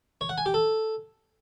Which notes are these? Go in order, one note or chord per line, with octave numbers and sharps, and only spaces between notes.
C#5
F#5
G#5
G4
A4